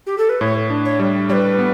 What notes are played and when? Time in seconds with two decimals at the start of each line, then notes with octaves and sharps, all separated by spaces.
0.07 G4
0.18 A4
0.29 B4
0.41 A2 C#5
0.70 D4
0.85 C#5
0.99 G3
1.30 G3 C#5
1.33 B4
1.59 B3